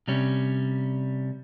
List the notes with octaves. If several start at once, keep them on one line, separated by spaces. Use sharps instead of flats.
C3 G3 C#4